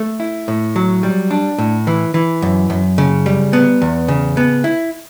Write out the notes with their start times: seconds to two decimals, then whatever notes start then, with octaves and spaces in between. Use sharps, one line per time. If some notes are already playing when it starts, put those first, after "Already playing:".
Already playing: A3
0.20 E4
0.48 A2
0.76 F#3
1.03 G3
1.31 D4
1.58 A2
1.87 E3
2.14 E3
2.42 F#2
2.70 F#2
2.98 C#3
3.26 G3
3.53 B3
3.82 E2
4.08 C#3
4.37 B3
4.64 E4